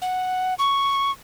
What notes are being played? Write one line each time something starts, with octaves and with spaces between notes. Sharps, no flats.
F#5
C#6